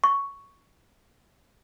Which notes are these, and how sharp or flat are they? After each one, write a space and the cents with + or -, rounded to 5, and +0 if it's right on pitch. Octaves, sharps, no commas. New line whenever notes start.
C#6 +5